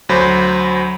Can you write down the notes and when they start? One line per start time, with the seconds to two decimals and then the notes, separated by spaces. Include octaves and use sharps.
0.09 D2 F#3 C5 B5